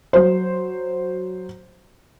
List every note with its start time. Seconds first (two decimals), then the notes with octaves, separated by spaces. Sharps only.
0.13 F#3 C5